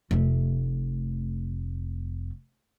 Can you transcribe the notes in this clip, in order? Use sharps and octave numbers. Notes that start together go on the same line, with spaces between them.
F1 A3